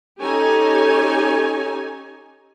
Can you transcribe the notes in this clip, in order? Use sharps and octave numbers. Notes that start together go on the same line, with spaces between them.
C#4 D#4 G4 A4 C#5 G#5